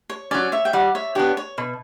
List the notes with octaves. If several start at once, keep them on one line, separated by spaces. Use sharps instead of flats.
C#5
F#3 C#4 D5
C#5 E5
G5
G3 D5 F#5
C#5 E5
B3 D4 G4 C#5
C#5
B2